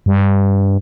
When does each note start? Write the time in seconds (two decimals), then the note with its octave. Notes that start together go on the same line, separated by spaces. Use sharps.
0.06 G2